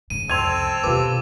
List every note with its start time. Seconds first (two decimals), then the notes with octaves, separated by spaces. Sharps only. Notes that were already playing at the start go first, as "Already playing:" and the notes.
0.10 G#2 C#3 D#7
0.30 C2 F2 C4 A4 C6 G#6 D#7 F7
0.84 B2 D3 F4 G4 B4 D6